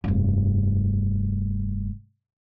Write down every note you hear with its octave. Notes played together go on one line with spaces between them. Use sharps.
F1 G2